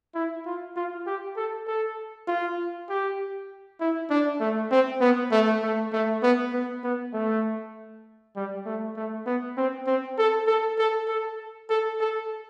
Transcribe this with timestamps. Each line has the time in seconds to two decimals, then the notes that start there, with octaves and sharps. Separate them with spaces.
0.15 E4
0.46 F4
0.76 F4
1.07 G4
1.36 A4
1.67 A4
2.28 F4
2.89 G4
3.80 E4
4.10 D4
4.40 A3
4.71 C4
5.01 B3
5.31 A3
5.62 A3
5.93 A3
6.22 B3
6.52 B3
6.84 B3
7.13 A3
8.36 G3
8.66 A3
8.96 A3
9.26 B3
9.57 C4
9.87 C4
10.18 A4
10.47 A4
10.78 A4
11.08 A4
11.70 A4
12.00 A4